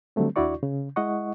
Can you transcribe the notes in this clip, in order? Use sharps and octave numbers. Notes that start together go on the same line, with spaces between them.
D3 F#3 G3 A3 C4
D#2 D4 E4 F#4 D5 C#6
C#3
G#3 E4 D#5 F#5 C#6